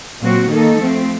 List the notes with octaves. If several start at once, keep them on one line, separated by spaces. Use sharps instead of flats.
A#2 F#3 C4 F#4
D#3 A#3 D#4 A4
F3 A3 C4